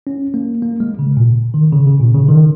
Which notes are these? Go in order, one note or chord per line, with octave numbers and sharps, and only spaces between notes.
C#4
A#3
A#3
G#3
C#3
A#2
D#3
C#3
C#3
A#2
C#3
D#3